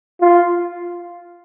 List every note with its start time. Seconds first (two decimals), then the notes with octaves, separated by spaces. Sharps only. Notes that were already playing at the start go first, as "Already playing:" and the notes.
0.21 F4